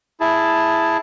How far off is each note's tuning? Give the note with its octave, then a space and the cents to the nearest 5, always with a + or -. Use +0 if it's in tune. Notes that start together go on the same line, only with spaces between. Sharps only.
E4 +5 G#4 +0 A5 +0